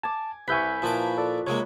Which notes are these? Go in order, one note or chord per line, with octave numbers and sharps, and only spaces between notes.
G#5 A5 D6
C2 B4 E5 G#5 C#6 G6 B6
A#2 E3 F3 A5 D6
A4 D5
C3 G#3 A#3 C#5